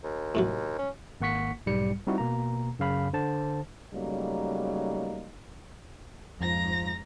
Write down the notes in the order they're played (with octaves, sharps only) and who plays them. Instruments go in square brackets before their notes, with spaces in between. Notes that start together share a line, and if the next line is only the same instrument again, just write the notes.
[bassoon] D#2
[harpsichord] A2 C3 F#3
[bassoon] C#4
[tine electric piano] G#1 A#3 F#5 C#6 B6 C#7
B1 G#2 G3 C#7
G3 C4 D#4 E4 F#4
B2 A#3 A#5
F#2 C#3 F5 B5
D3 C5 A5
[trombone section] C#3 F#3 G3 A3 A#3 D#4
[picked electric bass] F2 [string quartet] G#2 A#5 A#6 [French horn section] F3